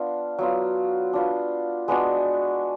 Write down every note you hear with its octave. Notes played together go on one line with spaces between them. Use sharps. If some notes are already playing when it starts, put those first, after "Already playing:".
Already playing: B3 D4 F4
F#3 B3 F4
D4 F4 B4
G#3 B3 D4 F#4